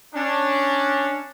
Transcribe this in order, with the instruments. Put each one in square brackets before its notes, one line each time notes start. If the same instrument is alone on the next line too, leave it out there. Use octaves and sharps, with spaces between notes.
[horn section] C#4 D4